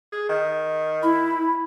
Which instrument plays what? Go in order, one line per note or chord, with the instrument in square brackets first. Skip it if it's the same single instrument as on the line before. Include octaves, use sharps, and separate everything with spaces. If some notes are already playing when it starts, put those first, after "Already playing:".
[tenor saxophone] G#4
D#3
[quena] E4 [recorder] B5